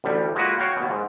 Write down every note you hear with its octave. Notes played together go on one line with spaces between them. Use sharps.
A1 D2 G3
G#3 A#3 F4 F#4 B4
F#4 C#5 F5 G5
D#2 B2
G#2